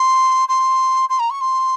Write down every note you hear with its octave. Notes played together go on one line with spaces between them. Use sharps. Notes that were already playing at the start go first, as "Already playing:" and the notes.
Already playing: C6
C6
C6
A#5
C#6
C6